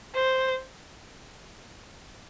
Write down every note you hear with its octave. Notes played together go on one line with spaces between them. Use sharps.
C5